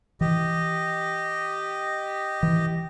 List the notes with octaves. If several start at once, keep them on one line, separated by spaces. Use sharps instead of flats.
E3 G4 D#5
E3